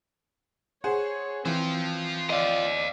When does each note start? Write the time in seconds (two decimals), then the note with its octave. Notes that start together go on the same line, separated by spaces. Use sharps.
0.84 G#4 C5 C#5 F#5
1.45 E3 C4 F4 C5
2.30 D5 D#5 F5